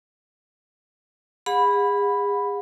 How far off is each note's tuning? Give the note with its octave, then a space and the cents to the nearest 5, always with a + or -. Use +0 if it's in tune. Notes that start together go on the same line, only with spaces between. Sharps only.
G#4 -35 F#5 -40 B5 +0